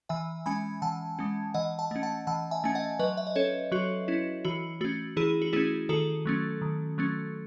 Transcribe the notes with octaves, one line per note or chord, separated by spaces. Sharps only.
E3 E5 G#5
G#3 C#4 G#5 B5
E3 F#5 A5
G#3 C#4
E3 D#5 F#5
F#5 A5
A3 C#4
F#5 A5
E3 F#5 A5
E5 G#5
A3 C#4 G#5
D#5 F#5
F#3 B4 D#5
E5
D#5
C#4 A4 C#5
F#3 F#4
C#4 E4
E3 F#4
A3 C#4 F#4
E3 E4 G#4
F#4
A3 C#4 E4 G#4
D#3 F#4 A4
F#3 A3 C#4
D#3
F#3 A3 C#4